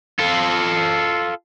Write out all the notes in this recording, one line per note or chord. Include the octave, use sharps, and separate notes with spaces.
F4 A4